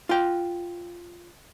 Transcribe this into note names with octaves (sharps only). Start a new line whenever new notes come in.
F4 G5